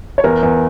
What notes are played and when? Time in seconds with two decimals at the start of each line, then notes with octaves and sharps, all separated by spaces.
0.18 C#5
0.24 E2 A#4
0.43 E2